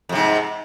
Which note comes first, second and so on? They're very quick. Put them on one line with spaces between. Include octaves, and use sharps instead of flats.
F2 C3 G#2